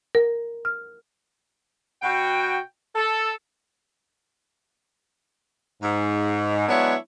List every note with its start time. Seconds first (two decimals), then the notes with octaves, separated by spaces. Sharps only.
0.15 A#4
0.65 F6
2.02 B2 F#4 G5
2.96 A4
5.81 G#2
6.68 F#3 G#3 B3 D4 E4 C#5